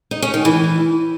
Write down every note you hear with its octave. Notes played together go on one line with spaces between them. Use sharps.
D#4
C#4
D#3
E3